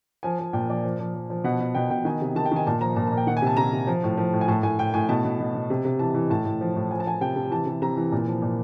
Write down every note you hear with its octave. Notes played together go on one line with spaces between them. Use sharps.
F3 G#5
F3
A#2 G5
F3 D5
F3
F3
F3
F3
B2 F#5
B2
B2 G5
B2 G5
D#3 G#5
C3
D#3 A5
G5
D#3 G#5
A#2 A5
F3 A#5
A#2 A5
A5
A#2
G5
D#3 F#5
G#5
C3 A5
C3 A#5
C3
F3
A2
F3
A2
G#5
A2 A5
A2 G#5
A2 G5
A2 G#5
B2 A5
B2
B2
B2
C3
C3
E3 A5
E3
A2 A5
A2
F3
A2
F3 G#5
A5
F3 G#5
C3 G5
C3
E3 A5
C3
C3 A#5
E3
A#2
F3
A#2